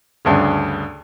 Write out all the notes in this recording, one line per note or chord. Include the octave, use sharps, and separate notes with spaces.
D2 G2 C#3